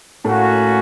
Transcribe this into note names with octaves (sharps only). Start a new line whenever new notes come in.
A2 A3 A#3 C#4 F#4